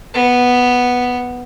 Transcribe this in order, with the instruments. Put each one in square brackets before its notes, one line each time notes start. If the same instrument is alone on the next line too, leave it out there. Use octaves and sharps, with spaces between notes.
[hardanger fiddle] B3